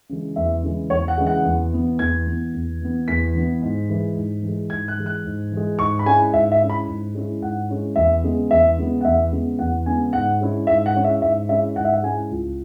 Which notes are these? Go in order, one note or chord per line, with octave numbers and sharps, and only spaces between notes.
C#3 E3 G#3
E2 E5
C#3 E3 G#3
E2 C#5
F#5
C#3 E3 G#3
F#5
E2
E3 B3
E2 G#6
E3 B3
E2
E3 B3
E2 B6
E3 B3
G#2
E3 G#3
G#2
E3
G#3
G#2 G#6
F#6
E3 G#3
F#6
G#2
E3 G#3
G#2 C#6
B5
G#3 C#4 E4 G#5
G#2 E5
E5
G#3 C#4 E4
B5
G#2
G#3 C#4 E4
G#2 F#5
G#3 C#4 E4
E2 E5
C#3 G#3 B3
E2 E5
C#3 G#3 B3
F#5
E2 E5
C#3 G#3 B3
E2 F#5
C#3 G#3 B3 G#5
G#2 F#5
G#3 C#4 E4
G#2 E5
F#5
G#3 C#4 E4
E5
G#2 E5
G#3 C#4 E4 E5
G#2 F#5
E5
F#5
G#3 C#4 E4 G#5
C#2